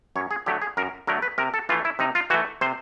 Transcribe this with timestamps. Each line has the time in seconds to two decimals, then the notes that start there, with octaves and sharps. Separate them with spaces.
0.16 F#2 C#5
0.31 G#4
0.46 D3 F#3 A3 G4
0.62 G#4
0.77 F#2 A#4
1.07 D3 F#3 A3 A#4
1.22 B4
1.38 C3 A#4
1.54 A4
1.69 E3 F4
1.72 A3
1.85 E4
1.99 C3 D#4
2.15 F4
2.30 E3 F#4
2.34 A3
2.61 C3 C5